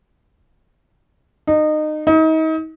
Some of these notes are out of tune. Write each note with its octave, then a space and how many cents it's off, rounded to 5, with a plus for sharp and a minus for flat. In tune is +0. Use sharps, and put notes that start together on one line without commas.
D#4 -25
D#4 +35